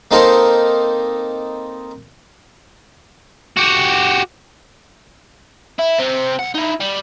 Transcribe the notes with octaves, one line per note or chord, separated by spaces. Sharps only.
A#3 C4 D#4 A4 A#4 C5
F#4 G4
E4
C3 C4
B1 F#5
D#4 E4
G3